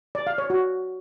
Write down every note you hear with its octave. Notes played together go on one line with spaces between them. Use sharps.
D5
F5
C#5
F#4